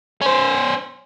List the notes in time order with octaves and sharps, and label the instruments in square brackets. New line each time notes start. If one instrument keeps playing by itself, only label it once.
[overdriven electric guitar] C#4 C5